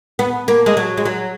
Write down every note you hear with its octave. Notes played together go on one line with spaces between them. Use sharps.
B3
A#3
G#3
F#3
G#3
F#3